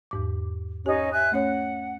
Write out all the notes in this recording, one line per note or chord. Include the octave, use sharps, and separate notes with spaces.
E2 G#2 D6
C#4 D#4 G4
E5 G#5 F#6
A3 C#4 C#5 F#5